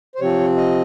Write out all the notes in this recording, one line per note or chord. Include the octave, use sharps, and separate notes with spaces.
C5
C3 F3 C4 C#5
D#5